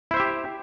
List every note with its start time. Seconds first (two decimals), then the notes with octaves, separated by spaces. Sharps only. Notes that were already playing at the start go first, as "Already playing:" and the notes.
0.11 E4
0.14 C5
0.17 E5
0.20 G4